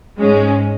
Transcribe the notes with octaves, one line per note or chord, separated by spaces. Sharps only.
G#2 G#3 C#4